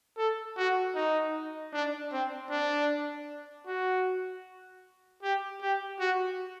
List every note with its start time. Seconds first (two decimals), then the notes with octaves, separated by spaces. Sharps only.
0.18 A4
0.57 F#4
0.95 D#4
1.73 D4
2.12 C4
2.51 D4
3.67 F#4
5.22 G4
5.61 G4
6.00 F#4